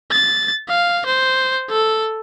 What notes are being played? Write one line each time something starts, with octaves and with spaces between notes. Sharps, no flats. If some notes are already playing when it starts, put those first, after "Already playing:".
A6
F5
C5
A4